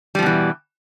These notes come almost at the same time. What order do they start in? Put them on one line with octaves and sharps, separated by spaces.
G3 F3 B2 E3